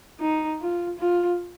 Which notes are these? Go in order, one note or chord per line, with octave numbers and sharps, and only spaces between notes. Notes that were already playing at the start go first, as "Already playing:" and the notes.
D#4
F4
F4